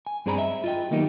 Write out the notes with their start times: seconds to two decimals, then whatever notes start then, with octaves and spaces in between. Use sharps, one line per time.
0.07 G#5
0.26 G2 C4 G#4 D5 A#5 B5
0.38 D#5 E5
0.64 F4 D#5 G5
0.91 D#3 F#3 A#3 B3 D#4 G4